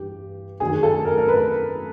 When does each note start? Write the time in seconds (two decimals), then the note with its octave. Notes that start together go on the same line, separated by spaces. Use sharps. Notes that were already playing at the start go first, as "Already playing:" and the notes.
Already playing: G2 E3 G4
0.60 F#2 D#3 G#4
0.83 A4
1.05 A#4
1.18 A#4
1.28 B4